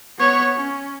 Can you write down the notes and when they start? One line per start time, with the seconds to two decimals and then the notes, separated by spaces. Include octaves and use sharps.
0.19 B3 C#5
0.56 C#4